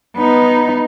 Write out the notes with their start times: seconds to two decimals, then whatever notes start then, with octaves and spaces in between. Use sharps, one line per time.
0.17 B3 D#4